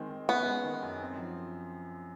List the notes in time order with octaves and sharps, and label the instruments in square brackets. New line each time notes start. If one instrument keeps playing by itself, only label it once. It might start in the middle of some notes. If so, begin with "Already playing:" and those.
Already playing: [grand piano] D#3 G#3 C4
G#3
[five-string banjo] B3 [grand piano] C#4
[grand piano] G#3
D#3
F#2
C4
F3